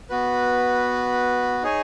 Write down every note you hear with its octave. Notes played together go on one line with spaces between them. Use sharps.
B3 F#4 B4
D#4 G#4 C#5 G#5